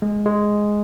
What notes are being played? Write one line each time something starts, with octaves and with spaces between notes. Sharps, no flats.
G#3
G#3